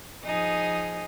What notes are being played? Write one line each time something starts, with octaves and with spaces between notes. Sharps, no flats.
F3 D#4 G#4